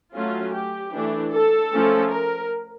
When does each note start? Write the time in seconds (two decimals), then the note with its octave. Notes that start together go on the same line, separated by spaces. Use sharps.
0.14 F#3 A3 C#4 F4
0.54 G4
0.94 E3 A3 D4
1.33 A4
1.72 F3 A3 C#4
2.12 A#4